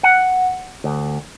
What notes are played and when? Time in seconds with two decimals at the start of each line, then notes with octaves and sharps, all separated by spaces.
0.03 F#5
0.84 D2